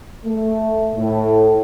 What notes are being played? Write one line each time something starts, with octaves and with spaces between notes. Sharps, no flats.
A3
A2